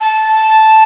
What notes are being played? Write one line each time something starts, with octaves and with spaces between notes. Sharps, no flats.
A5